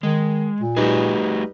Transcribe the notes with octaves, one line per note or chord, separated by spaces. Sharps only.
D#3 G#3
A#2
G3 A3 D#4 F#4 G#4 B4